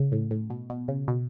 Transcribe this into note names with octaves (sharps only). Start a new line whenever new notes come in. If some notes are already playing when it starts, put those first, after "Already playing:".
Already playing: C#3
A2
A2
B2
B2
C#3
B2